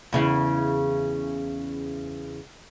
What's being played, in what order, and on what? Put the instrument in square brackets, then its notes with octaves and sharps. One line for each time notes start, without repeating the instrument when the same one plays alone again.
[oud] E2 C#3 E4